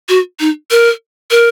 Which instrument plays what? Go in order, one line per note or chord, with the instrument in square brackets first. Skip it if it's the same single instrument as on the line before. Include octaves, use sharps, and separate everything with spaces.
[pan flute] F#4
D#4
A#4
A#4